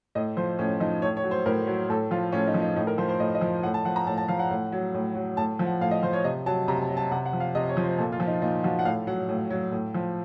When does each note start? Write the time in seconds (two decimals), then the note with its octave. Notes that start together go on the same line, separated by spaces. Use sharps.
0.15 A2 D#5
0.37 F3 C5
0.59 A2 C#4
0.80 F3 D#4
1.02 A2 C#5
1.17 C#5
1.24 F#3
1.31 C5
1.46 A2 A#4
1.67 F#3
1.89 A2 A4
2.11 F3 F4
2.32 A2 C#4
2.47 D#4
2.54 F3
2.62 D#4
2.76 A2 D#4
2.87 A#4
2.98 F3 C5
3.09 C5
3.20 A2 D#5
3.35 D#5
3.41 F3
3.63 A2 F#5
3.74 A5
3.85 F3 F#5
3.96 A#5
4.07 A2 A5
4.17 A5
4.28 F3 F5
4.39 F#5
4.51 A2
4.72 F#3
4.94 A2
5.15 F#3
5.37 A2 A5
5.59 F3
5.66 F#5
5.81 A2 F5
5.91 D#5
6.03 F3 C5
6.13 C#5
6.24 C3 D#5
6.46 F#3 A5
6.68 C3 A#5
6.82 A5
6.89 F#3
6.97 A5
7.11 C3 F#5
7.26 F#5
7.33 F3
7.40 F5
7.55 C3 D#5
7.69 C#5
7.77 F3
7.84 C5
7.98 A#2 A4
8.12 F4
8.20 F3
8.27 D#4
8.42 A#2 D#4
8.63 F3 F#4
8.79 F#5
8.85 A2 F5
9.07 F#3 F#5
9.29 A2
9.50 F#3
9.72 A2
9.94 F3